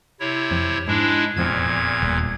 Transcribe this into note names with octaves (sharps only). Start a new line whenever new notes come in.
C3 E4 C#5
F2 F3
G#2 G#3 D4 E4
F1 E2 A#2 F3 C4 G#6
D#1